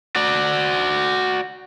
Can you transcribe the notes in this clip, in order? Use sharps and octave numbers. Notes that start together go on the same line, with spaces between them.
F#4 D5